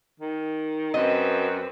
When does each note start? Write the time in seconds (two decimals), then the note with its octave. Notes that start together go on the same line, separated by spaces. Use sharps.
0.20 D#3
0.94 F#2 C4 B4 D#5